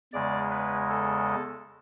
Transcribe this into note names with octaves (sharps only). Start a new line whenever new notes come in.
E2 C#3 G#3 D5
B4
A4